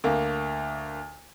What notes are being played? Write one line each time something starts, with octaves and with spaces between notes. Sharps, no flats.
D2 A#3